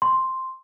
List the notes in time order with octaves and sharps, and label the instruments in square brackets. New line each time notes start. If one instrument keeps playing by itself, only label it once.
[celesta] C6